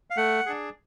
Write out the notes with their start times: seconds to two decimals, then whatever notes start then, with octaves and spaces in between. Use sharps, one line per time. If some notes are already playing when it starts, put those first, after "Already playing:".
0.10 F5
0.17 A3 F#5
0.46 D4 G#4